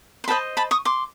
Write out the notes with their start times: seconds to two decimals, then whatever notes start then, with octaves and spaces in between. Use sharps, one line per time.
0.24 C6
0.28 G4 C5 D#5 A5 B5
0.57 A5 B5
0.71 C#6 D#6
0.85 C6 D6